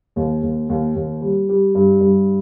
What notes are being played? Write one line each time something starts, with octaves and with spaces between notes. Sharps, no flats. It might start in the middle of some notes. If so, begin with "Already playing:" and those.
D#2
D#2
D#2
D#2
G3
G3
G2
G2